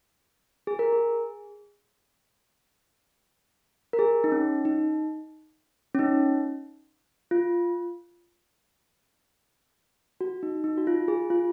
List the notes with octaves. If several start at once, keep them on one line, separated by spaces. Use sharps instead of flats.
G#4
A#4
G#4
A#4
G#4
D#4
C#4
D#4
C#4
D#4
F4
F#4
D#4
D#4
F#4
F4
G#4
F4